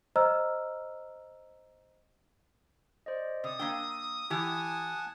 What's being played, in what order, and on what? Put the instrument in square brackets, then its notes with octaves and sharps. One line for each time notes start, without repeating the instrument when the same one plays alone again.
[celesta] C5 D#5 A#5 E6 F6
[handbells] C5 D5 D#5
[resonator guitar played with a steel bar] C3 [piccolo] D#6
[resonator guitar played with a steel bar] A#3 D4 G5 [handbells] A#5 E6
[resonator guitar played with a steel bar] E3 G4 [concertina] F#5 G#5 A5